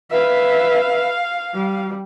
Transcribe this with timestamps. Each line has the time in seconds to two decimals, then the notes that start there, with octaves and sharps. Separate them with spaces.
0.11 B4 E5 F5
1.54 G3